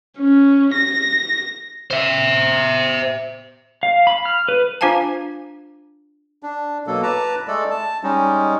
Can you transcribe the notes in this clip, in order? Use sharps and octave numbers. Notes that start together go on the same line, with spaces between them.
C#4
A#6
C5 E5
F5
B5
F6
B4
D4 F4 C5 F5 G#5 A5
D4
B2 F#3 A#3 A4
B4 A5 A#5 D6
G#3 A3 A4 D5
A5
G3 G#3 C#4 D#4